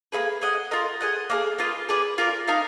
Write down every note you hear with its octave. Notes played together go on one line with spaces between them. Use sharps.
A#3 D#4 G#4 B4
G#4 D#5 F#5
F4 A#4 D#5
G#4 D#5 F#5
A#3 D4 G#4
A#3 F4 B4 D#5
G#4 B4 D5
F4 A#4 D5
D#4 A#4 F5